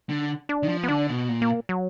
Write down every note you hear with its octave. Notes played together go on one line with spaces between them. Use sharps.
D3
D4
D#3
F3
B3
D3 D4
B2
A#2
A#3
F#3